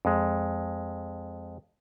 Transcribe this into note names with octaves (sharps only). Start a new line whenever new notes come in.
F2 G#3